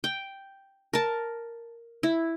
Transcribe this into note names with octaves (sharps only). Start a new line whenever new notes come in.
G5
A#4 A5
E4